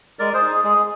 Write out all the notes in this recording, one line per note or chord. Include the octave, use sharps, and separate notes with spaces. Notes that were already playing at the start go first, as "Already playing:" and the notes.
G#3 A#4 D5
G#4 C5
D#4
G#4
G#3 G#4